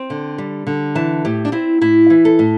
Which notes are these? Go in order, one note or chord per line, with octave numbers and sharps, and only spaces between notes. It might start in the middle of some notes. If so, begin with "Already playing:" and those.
Already playing: C4
D3
G3
D3
E3 A5
A2 G4
D4
C4 E4
A2 E4
E3
A4
A2